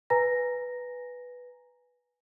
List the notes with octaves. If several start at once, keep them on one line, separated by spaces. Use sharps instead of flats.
B4 G#5 A#5 A#6